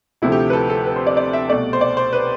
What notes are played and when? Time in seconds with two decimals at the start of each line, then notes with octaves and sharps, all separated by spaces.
0.22 D2 C3 F3 A3 E4
0.32 G4
0.50 B4
0.53 A4
0.70 A4
0.86 B4
0.96 C5
1.07 D5
1.17 D5
1.33 E5
1.49 C2 B2 A3 D5
1.73 C5
1.81 D5
1.97 C5
2.13 B4